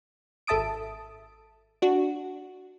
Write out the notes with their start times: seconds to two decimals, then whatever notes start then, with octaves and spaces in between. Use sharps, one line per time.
0.47 G#1 A4 E5 A5 D#6 D7
1.82 D4 F#4